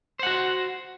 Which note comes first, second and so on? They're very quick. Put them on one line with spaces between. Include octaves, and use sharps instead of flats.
C5 F#5 F#4